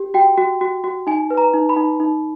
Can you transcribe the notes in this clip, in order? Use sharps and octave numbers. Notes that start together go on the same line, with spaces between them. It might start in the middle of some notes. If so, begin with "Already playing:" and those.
Already playing: G4
F#4 G5
F#4
F#4
F#4
D#4 G#5
B4
A#5
D#4
B5
D#4
D#4